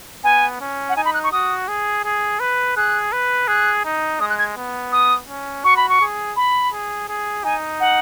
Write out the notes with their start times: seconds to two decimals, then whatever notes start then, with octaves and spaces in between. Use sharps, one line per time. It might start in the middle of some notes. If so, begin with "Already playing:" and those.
0.24 B3 G#5
0.61 C#4
0.89 F#5
0.96 D#4 G#5
1.05 B5
1.14 F#6
1.24 C#6
1.32 F#4 D#6
1.68 G#4
2.04 G#4
2.40 B4
2.76 G#4 F#6
3.12 B4
3.48 G#4 F#6
3.85 D#4
4.20 G#3 D#6
4.30 F#6
4.39 G#6
4.57 B3
4.92 D#6
5.29 C#4
5.64 F#4 C#6
5.77 B5
5.89 C#6
6.01 G#4
6.36 B5
6.73 G#4
7.09 G#4
7.44 D#4 G#5
7.80 F#5